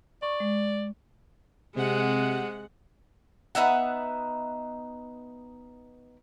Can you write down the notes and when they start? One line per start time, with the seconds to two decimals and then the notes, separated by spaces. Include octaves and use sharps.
0.22 D5 C#6
0.40 G#3
1.76 C3 G#3 F#5
3.55 B3 D#4 E5 F#5